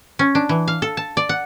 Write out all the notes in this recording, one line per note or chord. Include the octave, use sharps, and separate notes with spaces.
C#4
D4
E3
F5
A4
A5
D5
F#5